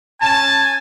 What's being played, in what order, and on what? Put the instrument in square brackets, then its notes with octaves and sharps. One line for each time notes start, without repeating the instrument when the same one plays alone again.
[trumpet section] C#4 A5 [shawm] G#5